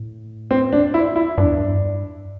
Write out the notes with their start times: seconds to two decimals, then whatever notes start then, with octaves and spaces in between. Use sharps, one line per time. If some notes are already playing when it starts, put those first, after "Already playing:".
Already playing: A2
0.51 C4
0.73 D4
0.94 E4
1.16 E4
1.37 G2 D4
1.45 E2
1.54 G2